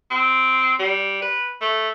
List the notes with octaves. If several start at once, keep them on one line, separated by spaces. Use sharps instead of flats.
C4
G3
B4
A3